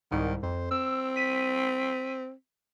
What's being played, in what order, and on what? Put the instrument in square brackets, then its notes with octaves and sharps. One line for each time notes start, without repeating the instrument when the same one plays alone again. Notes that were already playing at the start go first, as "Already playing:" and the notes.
[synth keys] C2 G#2 [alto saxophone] D#3
[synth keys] F2 [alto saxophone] C5
[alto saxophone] C4 [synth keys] E6
[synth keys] B6 D#7